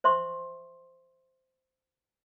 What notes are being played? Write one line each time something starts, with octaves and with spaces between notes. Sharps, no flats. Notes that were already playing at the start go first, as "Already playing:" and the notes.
C5 E5 C6 C#6